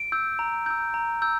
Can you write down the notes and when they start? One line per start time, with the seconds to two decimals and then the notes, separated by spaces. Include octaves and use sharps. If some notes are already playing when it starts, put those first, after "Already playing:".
Already playing: D7
0.12 E6 G6
0.39 A#5
0.66 E6 G6
0.94 A#5
1.22 E6 G6